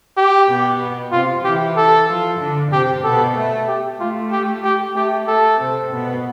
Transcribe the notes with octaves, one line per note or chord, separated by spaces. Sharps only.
G4
B2 B3
C3 C4 F4
E3 E4 G4
A4
F3 F4
D3 D4
C3 C4 G4
B2 B3 A4
A3
G4
A3 F4
G4
G4
A3 G4
A3 A4
C3 C4
B2 B3